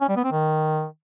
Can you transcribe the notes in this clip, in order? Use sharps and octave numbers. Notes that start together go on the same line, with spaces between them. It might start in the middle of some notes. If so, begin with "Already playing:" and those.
C#4
G3
B3
C4
D#3